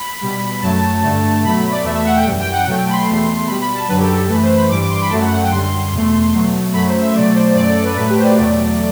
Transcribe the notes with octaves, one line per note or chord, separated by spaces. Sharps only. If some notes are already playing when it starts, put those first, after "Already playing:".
Already playing: B5
B2 G3
F#2 F#3 A3 A5
G2 D3 A3
B2 F#3 A3 B5
D5
E2 B2 A3 E5
E5
F#5
G5
F#2 E3 G3
G5
F#5
B2 F#3 A3 G5
B5
C6
E2 B2 A3
B2 G3 B5
B5
A5
F#2 D3 F#3 B4
G4
A4
A4
F#2 E3 A3 B4
C5
B5
G2 E3 G3 D6
D6
C6
B5
F#2 F#3 A3 A5
F#5
F#5
G5
F#2 D3 G3 C6
E2 B2 A3
B2 F#3 A3
F#2 F#3 A3 B5
C5
E5
B2 F#3 A3 D5
C5
F#2 F#3 A3 D5
A4
B4
A2 F#3 A3 B4
G4
C5
D5
E2 B2 F#3 A3